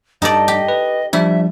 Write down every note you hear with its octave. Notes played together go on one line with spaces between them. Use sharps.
G2 G3 D#4 A4 D5 D#5
G4
B4
F3 G3 D4 E4 E5